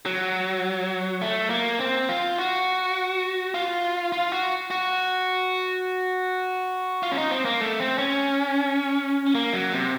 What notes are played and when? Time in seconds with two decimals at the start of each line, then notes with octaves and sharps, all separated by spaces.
0.06 F#3
1.22 A3
1.50 A#3
1.80 C4
2.09 F4
2.38 F#4
3.54 F4
4.12 F4
4.32 F#4
4.71 F#4
7.03 F4
7.12 C#4
7.17 D#4
7.31 C4
7.45 A#3
7.61 A3
7.80 C4
7.98 C#4
9.35 A#3
9.53 F#3
9.73 C3